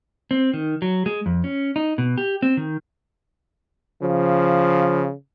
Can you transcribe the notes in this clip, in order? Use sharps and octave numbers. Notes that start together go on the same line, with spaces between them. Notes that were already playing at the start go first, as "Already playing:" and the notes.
C4
D#3
F#3
G#3
F2
C#4
D#4
B2
G4
C4
D#3
C#3 F3